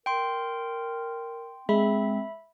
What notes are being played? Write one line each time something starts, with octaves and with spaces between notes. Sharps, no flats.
A#4 G5 C6
G#3 C4 E5 B5